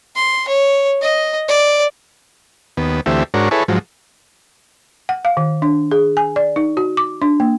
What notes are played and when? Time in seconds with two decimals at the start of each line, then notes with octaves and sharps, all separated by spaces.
0.15 C6
0.48 C#5
1.02 D#5
1.49 D5
2.77 D#2 B3
3.06 D2 E3 A3 C4 G4 E5
3.34 G#2 D4 F#4 A#4 C#5
3.51 E4 G#4 A4 B4 C#5
3.68 G#2 F3 F#3
5.09 F#5
5.25 F5
5.37 D#3
5.62 D4
5.92 G#4
6.17 G#5
6.36 D5
6.56 D#4
6.77 F#4
6.97 D6
7.22 D4
7.40 A#3